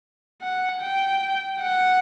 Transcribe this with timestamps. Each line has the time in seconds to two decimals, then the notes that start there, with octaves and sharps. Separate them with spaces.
0.42 F#5
0.81 G5
1.61 F#5